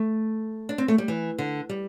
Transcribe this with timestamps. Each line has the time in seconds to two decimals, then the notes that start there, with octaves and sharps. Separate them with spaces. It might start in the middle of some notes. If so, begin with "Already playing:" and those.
Already playing: A3
0.69 D4
0.78 C4
0.88 A3
0.98 G3
1.08 E3
1.38 D3
1.69 G3